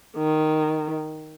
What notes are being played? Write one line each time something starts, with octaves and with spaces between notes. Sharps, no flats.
D#3